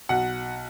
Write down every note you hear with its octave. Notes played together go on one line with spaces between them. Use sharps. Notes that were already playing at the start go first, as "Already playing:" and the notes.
B1 F#5